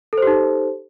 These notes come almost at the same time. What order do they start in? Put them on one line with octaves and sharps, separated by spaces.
A4 C5 G4 D#4